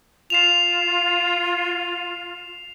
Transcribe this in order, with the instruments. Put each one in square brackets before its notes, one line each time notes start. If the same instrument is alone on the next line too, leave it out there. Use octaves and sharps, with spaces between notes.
[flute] F4 [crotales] C7 E7 F7